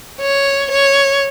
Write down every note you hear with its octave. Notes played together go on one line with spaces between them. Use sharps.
C#5
C#5